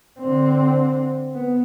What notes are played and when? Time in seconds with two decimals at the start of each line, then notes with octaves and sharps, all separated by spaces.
0.20 D3 C4
1.34 B3